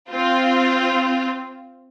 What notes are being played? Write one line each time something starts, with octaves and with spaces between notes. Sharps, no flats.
C4 F4